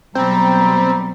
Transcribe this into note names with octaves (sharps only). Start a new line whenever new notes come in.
B2 F#3 G3 C4 A#5